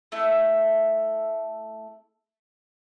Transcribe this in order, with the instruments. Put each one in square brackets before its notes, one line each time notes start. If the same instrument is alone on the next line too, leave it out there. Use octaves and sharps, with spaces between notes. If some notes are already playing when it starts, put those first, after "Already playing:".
[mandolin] A3 E4 A4